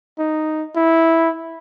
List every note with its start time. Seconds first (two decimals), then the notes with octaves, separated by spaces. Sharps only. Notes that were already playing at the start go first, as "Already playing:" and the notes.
0.19 D#4
0.76 E4